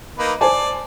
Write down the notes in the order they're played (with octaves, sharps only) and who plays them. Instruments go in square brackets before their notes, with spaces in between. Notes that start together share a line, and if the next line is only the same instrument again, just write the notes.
[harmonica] A#3 D#4 B4
[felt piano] C5 G#5 A5 [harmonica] D5